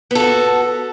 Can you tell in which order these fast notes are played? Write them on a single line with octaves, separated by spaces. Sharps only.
B3 A4 F#4